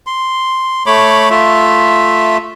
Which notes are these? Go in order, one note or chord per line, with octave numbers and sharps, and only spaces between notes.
C6
A3 C#5 B5 D6
A3 F4 E5